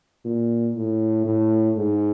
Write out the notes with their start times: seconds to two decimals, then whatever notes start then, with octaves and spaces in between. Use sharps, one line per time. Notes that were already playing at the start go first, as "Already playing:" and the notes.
0.25 A#2
0.76 A2
1.25 A2
1.77 G#2